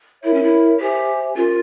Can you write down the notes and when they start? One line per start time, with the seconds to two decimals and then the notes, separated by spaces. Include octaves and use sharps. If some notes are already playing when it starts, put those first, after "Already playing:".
0.23 E4 A#4 C#5 E5
0.34 C#4
0.43 E4
0.79 G4 C5 E5 G#5
1.36 C#4 F4 G4 A#4